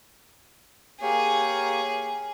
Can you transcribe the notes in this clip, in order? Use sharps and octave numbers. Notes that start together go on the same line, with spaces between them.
A#3 G4 G#4 C#5